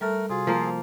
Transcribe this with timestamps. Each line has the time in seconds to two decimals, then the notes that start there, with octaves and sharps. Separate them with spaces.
0.01 G3 A3 A4 A#4 F6
0.30 C3 F4 F#4 G#4
0.47 F3 A#3